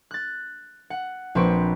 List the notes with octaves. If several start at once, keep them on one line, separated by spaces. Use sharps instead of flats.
F#6 A6
F#5
A#1 C4 B4 C#6 D7